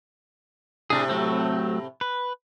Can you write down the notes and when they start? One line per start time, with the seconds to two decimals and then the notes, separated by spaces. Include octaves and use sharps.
0.90 A2 C3 D4 G#4
1.09 F#3 A3 C4
2.01 B4